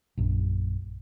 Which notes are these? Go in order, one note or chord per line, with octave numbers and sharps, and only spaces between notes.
A#1 F#2